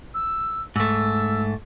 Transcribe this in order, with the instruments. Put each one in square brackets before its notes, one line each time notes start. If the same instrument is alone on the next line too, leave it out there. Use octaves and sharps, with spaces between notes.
[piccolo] E6
[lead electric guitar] G#2 A3 [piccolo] E6